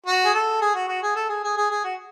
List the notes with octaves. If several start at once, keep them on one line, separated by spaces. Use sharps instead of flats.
F#4
G#4
A4
G#4
F#4
F#4
G#4
A4
G#4
G#4
G#4
G#4
F#4